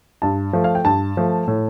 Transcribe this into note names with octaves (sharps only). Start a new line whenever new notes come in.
G2 A5
F3 A3
F5
G5
G2 A5
F3 A3
A2